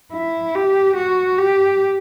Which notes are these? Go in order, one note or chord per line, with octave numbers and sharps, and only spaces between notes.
E4
G4
F#4
G4